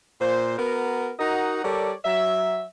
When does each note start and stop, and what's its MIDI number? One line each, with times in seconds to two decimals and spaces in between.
0.21 0.54 46
0.21 0.54 72
0.59 1.11 59
0.59 1.11 66
0.59 1.11 70
1.20 1.62 63
1.20 1.62 66
1.20 1.62 70
1.20 1.62 75
1.20 1.62 78
1.65 1.94 55
1.65 1.94 69
1.65 1.94 70
1.65 1.94 73
1.65 1.94 74
2.05 2.65 54
2.05 2.65 76